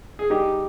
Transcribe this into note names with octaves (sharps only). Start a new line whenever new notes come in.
G#4
G3 D#4 G4